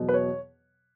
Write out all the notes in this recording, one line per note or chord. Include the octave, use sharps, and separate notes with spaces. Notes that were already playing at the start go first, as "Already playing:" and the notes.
Already playing: E2 B2 F#3
B4
C#5